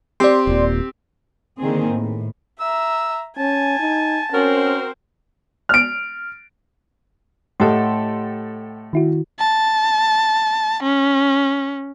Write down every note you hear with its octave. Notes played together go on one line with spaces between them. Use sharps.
C4 G4 D5 C6
D#1 A#2
D3 D#3 A#3 C4 G#4
A2
E5 A#5 E6
C#4 G#5 A5
D#4
C4 C#4 F#4 A#4 C5
F6 D7
A2 G4 A4 D#5 F#5 C6
D#3 E4 F#4
A5
C#4